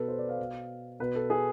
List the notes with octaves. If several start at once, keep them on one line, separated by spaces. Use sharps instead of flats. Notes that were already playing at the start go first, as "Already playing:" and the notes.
Already playing: B2 A4 B4
C5
D5
F5
B2
B2 B4
A4
G#4